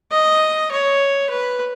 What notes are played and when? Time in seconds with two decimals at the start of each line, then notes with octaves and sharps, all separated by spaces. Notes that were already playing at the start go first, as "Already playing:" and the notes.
0.11 D#5
0.71 C#5
1.30 B4